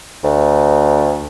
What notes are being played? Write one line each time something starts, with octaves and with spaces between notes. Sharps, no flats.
D2